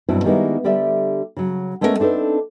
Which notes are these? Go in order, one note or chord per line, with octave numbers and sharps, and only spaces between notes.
E2 G2 B2 F#3 C4 E4
D#3 G3 G#3 A#3 B3 E4
D3 G3 G4 D5 E5
C#3 F#3
G#3 A3 B3 C#4 F#4 A#4
C4 D4 D#4 A4 B4